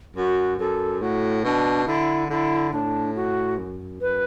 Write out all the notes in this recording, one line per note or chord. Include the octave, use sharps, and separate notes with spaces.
F#2 F#4
F#2 A4
A2 F#4
B2 D4
D3 E4
D3 E4
A2 D4
F#4
F#2
F#2 B4